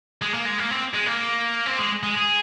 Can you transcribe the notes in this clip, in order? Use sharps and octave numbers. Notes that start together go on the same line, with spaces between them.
G#3
A#3
G#3
A#3
C4
G#3
A#3
C4
G#3
G#3
G#4